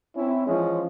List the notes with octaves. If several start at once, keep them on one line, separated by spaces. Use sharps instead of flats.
C4 C#4 E4
E3 F3 G#3 C#4